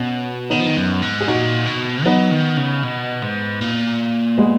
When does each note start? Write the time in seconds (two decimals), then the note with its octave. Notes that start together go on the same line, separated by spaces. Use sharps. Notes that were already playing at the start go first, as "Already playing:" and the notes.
Already playing: B2 C#4
0.50 D#3 B3 D#4
0.59 F3
0.66 D#3
0.77 F#2
1.02 G#2
1.20 G#4
1.28 A#2 D#4 F#4
1.66 B2
2.05 F#3 B3 D#4
2.31 D#3
2.57 C#3
2.83 B2
3.22 G#2
3.61 A#2
4.37 G#3 B3